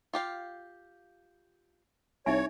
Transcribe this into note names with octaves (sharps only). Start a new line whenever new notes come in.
F4 G4 F5
C2 D#4 C#5 E5 G#5